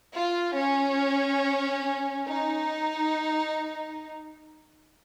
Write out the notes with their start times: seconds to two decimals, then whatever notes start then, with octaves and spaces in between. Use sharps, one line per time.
0.16 F4
0.58 C#4
2.29 D#4